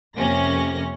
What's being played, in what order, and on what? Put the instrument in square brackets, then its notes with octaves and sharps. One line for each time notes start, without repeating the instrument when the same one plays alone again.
[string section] F2 C3 A#3 C#4 A#6